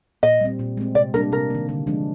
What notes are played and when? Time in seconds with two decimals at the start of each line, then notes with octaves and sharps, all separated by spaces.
0.23 A#2 D#5
0.41 G3 C4
0.59 A#2
0.77 G#3 C4
0.95 C3 D5
1.14 G3 A#3 D4 A#4
1.32 C3 A#4
1.50 D#3 A#3
1.69 D3
1.87 F3 G#3 D4